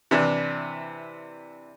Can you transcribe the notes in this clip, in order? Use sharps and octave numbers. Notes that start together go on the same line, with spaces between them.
C3 E3 D4